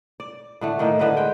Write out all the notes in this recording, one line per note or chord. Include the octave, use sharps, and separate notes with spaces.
D5
A2 D3 A3
A2 D#3 A#3 D#4
A2 D3 B4 D#5
G#3 G5